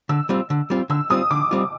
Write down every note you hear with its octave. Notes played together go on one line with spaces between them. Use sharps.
D3 E6
G3 C4 F4
D3
G3 C4 F4
D3 E6
G3 C4 F4 D#6
D3 D6
G3 C4 F4